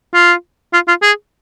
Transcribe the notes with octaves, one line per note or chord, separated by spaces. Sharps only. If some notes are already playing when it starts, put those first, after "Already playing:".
F4
F4
F4
G#4